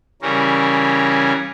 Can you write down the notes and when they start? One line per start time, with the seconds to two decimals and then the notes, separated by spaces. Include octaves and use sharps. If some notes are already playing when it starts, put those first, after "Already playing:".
0.22 C#3 E3 G3 C#4 A#4